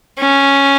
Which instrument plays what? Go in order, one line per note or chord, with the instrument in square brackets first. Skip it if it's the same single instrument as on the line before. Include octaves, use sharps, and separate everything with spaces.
[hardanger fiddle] C#4